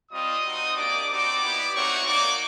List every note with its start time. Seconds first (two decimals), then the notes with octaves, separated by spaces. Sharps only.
0.11 G3 C4 F4 D#5 D#6
0.45 C4 D#4 F#4
0.76 A#3 D4 G4 D5 D6
1.10 C4 D#4 F#4 D5 D6
1.42 B3 E4 G4
1.74 A3 C4 D#4 F#4 C#5 C#6
2.06 A#3 D#4 F#4 D5 D6